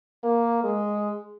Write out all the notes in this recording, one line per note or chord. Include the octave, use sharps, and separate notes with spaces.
A#3
G#3